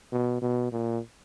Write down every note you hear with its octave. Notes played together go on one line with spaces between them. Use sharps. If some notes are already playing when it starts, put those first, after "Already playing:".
B2
B2
A#2